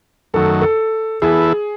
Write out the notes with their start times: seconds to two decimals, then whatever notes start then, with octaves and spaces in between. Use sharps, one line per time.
0.34 F#2 D#3 F#3 A3 A4
0.61 A4
1.22 E3 B3 E4 G#4 A4